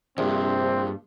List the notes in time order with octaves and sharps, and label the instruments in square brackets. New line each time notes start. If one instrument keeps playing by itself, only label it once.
[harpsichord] A#1 [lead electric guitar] E2 G2 [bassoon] C3 [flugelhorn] C4